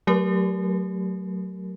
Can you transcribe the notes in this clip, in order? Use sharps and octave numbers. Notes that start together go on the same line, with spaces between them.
F#3 A3 G4 A#4